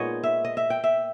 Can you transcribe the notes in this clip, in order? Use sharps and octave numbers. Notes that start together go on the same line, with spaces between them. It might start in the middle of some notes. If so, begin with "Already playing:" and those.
Already playing: A#2 G#3 B3 D#4 C#5 D#5
E5
D#5
E5
G5
E5